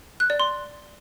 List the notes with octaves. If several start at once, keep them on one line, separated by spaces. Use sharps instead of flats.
F#6
D5
C6